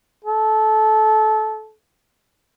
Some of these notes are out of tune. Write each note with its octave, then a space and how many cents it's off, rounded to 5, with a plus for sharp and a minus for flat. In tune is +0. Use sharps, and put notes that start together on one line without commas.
A4 -20